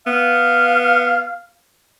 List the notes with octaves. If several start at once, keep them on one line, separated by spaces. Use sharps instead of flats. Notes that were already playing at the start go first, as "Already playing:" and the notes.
B3 F5